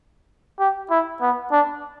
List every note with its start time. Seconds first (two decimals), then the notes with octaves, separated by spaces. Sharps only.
0.59 G4
0.90 E4
1.21 B3
1.52 D4